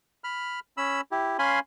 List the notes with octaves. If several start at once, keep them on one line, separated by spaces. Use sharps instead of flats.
B5 F6
C#4 B5 E6
E4 G4
C#4 F5 G#5 B5 C6